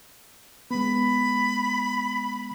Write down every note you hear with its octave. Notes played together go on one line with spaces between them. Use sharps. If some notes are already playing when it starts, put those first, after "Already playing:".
G#3 B3 B5